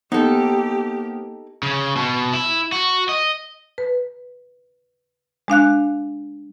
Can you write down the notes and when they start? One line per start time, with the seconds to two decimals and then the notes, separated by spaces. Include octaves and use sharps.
0.12 A#3 B3 D#4 G4 A4 C5
1.63 C#3
1.96 B2
2.33 E4
2.72 F#4
3.09 D#5
3.78 B4
5.48 G#3 D4 F5 F#6